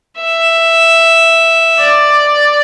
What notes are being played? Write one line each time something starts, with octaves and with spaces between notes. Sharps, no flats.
E5
D5